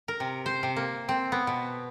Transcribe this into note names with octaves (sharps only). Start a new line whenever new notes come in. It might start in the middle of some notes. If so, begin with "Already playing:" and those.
A#4
C3
C5
C3
A#3
C4
B3
B2